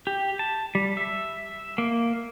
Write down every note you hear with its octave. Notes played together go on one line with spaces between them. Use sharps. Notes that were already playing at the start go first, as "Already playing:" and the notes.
G4
A5
G3
E5
A#3